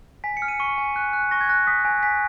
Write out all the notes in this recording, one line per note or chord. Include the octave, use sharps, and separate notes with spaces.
G#5 B6
C#7
F6
D#7
C#6 D#7
G#5
F#6
F#6
C#6 A#6
G#6
F#6 A#6
D#6 B6
G#5
G#5 B6